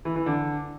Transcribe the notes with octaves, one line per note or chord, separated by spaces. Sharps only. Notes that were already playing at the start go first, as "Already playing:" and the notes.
E3
E3
D3